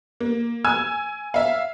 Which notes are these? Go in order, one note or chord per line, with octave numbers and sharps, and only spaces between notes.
A#3
G#5 E6 G#6
E5 F5